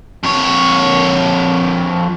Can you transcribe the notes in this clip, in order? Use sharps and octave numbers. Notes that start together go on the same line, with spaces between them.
F2 C#5